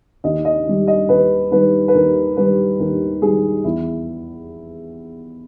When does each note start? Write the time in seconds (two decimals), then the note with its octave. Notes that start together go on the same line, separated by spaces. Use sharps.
0.24 D#2 D#5
0.45 D#5
0.67 D#3 G3
0.87 D#5
1.09 D#2 B4
1.51 D#3 G3 B4
1.88 B4
1.94 D#2 A#4
2.37 D#3 G3 B4
2.80 D#2 A#4
3.22 D#3 G3 G#4
3.64 E2 E4